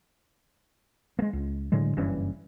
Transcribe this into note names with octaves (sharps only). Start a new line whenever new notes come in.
G#3 A#3
C#2
A2 D3 F#3 G#3
F#1 G2 E3 C#4